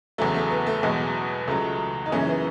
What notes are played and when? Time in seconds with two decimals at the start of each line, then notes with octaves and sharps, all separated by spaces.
0.18 E2 C#3 F#3 A3
0.35 A3
0.51 B3
0.67 A3
0.83 E2 B2 F#3 G#3
1.48 C#2 C#3 F#3 A3
2.06 D#4
2.12 F#2 C#3 E3 C#4
2.28 B3